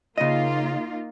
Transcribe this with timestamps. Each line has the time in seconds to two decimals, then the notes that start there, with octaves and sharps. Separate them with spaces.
0.18 C#3 A#3 D#4 F4 D#5